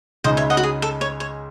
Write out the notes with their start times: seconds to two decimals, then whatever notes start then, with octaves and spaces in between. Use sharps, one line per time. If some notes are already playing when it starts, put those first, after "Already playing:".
0.24 C#2 C#3 G#3 D#4 C5 D#5
0.37 C#5 E5
0.50 D#5 F#5
0.57 F#4
0.63 G#4
0.82 A4
1.01 C#5
1.20 C#5